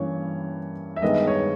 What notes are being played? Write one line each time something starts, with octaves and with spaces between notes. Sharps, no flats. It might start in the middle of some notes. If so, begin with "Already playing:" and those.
Already playing: G2 E3 A#3 C#4 C#5
E5
G2 D#3 G#3 B3 D#5
C#5